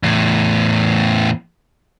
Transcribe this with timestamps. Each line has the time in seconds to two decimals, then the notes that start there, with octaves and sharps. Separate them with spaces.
0.03 E2 A2